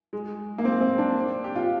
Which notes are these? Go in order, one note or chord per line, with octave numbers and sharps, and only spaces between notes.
G#3
A#3
C4
C4
D4
G4
F4